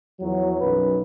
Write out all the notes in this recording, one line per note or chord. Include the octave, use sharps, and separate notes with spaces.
E2 F3 F#3
B1 F#2 B4